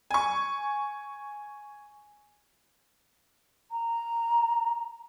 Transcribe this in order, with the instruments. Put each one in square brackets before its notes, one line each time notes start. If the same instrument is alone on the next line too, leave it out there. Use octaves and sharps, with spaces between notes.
[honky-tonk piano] G#5 C#6
[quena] A#5